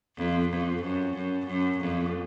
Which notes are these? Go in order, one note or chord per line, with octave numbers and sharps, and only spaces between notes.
F2
F2
F#2
F#2
F#2
F2